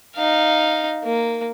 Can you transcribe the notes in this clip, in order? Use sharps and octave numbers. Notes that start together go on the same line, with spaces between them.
D#4 F5
A#3